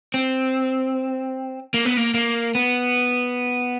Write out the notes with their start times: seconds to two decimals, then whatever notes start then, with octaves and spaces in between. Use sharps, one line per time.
0.14 C4
1.74 A#3
1.85 B3
1.97 A#3
2.14 A#3
2.55 B3